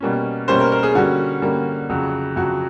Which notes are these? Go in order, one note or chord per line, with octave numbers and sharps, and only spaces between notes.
B2 G3 A#3 C#4
B2 G3 A#3 C#4 C5
A#4
A#4
G#4
D3 G3 A#3 C#4 F#4
D3 G3 A#3 C#4
F2 C#3 F#3
F2 C#3 F#3 F#4